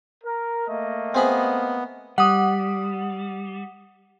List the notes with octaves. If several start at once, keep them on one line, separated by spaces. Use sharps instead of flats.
A#4
A3 A#3 D#5
B3 C4 G#4 B5
G3 F#5 D#6